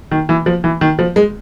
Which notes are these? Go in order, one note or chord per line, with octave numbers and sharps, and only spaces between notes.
D#3
E3
F3
E3
D#3
F3
G#3